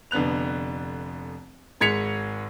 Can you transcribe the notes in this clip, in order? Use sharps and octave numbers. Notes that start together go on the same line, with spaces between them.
F1 D3 B3 F#6 F7
G#1 G#3 G#6 B6 C#7 F7